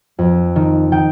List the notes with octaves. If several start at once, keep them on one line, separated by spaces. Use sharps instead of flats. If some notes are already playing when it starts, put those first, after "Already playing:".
F2
D#3
D#3 G5